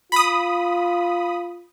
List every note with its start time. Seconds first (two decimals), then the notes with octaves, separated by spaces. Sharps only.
0.12 F4 B5 D#6